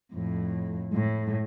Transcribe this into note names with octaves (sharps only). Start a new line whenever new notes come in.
F2 A2
A2